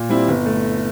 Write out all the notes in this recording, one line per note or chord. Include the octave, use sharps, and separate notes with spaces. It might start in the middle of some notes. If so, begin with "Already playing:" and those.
Already playing: A#2
G3 C4 E4
G1
A3